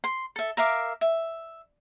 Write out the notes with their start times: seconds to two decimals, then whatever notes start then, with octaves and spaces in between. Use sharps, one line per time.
0.04 C6
0.36 A4 E5
0.57 A#4 E5 F5 D6
1.01 E5